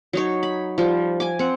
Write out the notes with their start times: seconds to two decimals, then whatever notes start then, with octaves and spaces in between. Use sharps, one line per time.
0.13 F#3 D#4 C#5
0.43 B5
0.78 F3 G3
1.20 G#5 D6
1.39 C4 F#5